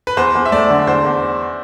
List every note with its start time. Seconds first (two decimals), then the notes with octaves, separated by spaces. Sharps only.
0.07 B4
0.17 E2 C5
0.35 E2
0.45 E5
0.52 A3 D5
0.70 D3
0.87 E2 C5
1.05 E2